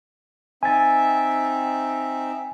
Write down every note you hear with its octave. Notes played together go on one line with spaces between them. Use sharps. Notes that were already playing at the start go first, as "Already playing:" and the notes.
C4 D#4 E5 G#5 A6